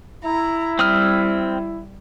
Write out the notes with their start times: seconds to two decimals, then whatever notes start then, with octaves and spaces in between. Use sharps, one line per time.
0.24 E4 A#5
0.79 G3 C4 D#6 F6